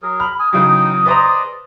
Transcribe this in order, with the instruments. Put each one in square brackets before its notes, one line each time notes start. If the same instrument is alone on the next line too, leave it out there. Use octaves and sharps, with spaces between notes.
[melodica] F#3 G#4 A#4
[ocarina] B5 [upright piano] F6
[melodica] G#5 [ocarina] D#6
[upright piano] C#3 E3 F#3 [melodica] D#4 G5 [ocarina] D#6
[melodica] G#4 D5 D#5 [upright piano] B4 C5 A#5